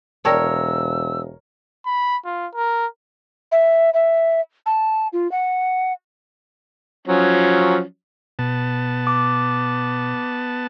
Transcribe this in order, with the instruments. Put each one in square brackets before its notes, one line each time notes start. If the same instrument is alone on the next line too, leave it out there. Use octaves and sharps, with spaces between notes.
[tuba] E1 [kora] A#4 C#5 [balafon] D5 G5 A5 [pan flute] E6
[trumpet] B5
F4
A#4
[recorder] E5
E5
A5
F4
F#5
[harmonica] F3 F#3 C#4
[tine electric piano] B2 [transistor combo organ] B3 A5
[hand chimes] D6